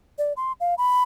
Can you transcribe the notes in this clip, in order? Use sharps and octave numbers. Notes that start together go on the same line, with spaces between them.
D5
C6
F5
B5